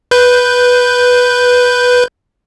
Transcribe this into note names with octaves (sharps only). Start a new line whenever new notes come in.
B4 G6